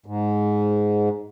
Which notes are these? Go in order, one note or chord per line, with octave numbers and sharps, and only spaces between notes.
G#2